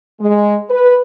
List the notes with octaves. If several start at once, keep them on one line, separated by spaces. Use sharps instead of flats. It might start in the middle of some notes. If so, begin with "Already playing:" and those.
G#3
B4